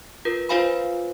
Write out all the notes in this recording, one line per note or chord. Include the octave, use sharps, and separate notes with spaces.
F4 A#4 B4
F4 B4 C5 F5 G#5 B5